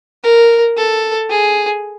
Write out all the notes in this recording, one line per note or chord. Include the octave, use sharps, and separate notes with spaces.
A#4
A4
G#4